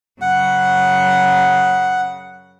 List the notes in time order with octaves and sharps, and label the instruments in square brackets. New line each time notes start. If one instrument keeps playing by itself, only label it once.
[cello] F#2 C#3 [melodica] F#5